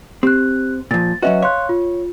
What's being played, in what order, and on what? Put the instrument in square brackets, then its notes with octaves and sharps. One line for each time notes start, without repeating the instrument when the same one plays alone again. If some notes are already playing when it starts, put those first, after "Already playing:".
[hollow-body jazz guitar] C4 [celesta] G4 F#6
[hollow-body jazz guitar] A#2 F3 [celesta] A6
[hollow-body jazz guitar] F#3 C#4 F#4 [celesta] B4 D#5 E5
[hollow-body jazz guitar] C#5 [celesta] F5 C6 F#6
[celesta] F4